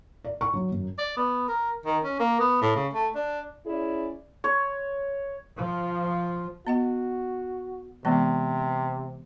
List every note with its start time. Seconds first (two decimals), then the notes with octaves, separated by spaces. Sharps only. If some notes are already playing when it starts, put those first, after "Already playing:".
0.24 D5
0.41 C#6
0.53 F#3
0.72 F#2
0.99 D5
1.17 B3
1.48 A#4
1.86 D#3
2.04 C#4
2.20 A#3
2.40 B3
2.62 A2
2.76 C#3
2.93 A3
3.15 D4
3.67 C#4 E4 G#4 D5
4.44 C#5
5.57 F3
6.67 B3 F#4 D#5 F#5
8.05 C3 E3 G#3 B3